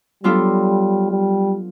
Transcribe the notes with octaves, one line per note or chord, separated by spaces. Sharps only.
F#3 G3 B3 D4 F4 A4
G3